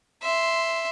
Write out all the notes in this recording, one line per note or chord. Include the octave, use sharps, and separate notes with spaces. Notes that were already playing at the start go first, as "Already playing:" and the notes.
E5 C6